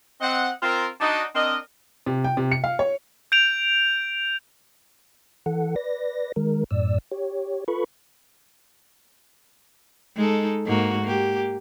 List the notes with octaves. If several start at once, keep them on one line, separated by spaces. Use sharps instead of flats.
C4 D#5 F#5
C4 F4 A#4
D4 D#4 F#4
C4 D4 A#4 D#5
C3
G5
C3
C#7
F5
C#5
G6 D7 F7
E3 A4 F#5
B4 D5 A#6
D#3 G#3 A#4
F#2 A2 D5 E6
G4 C#5
F4 A4 B4 B5 C#6
G#3 D#4 A4
G#2 A#3 F#4
A#3 G4